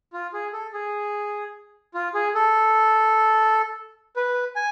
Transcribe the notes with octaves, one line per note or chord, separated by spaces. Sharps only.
F4
G#4
A4
G#4
F4
G#4
A4
B4
G#5